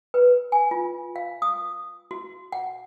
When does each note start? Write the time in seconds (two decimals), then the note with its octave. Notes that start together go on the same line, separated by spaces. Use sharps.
0.14 B4
0.52 G#5
0.71 F4
1.16 F5
1.42 D#6
2.11 F#4
2.52 F#5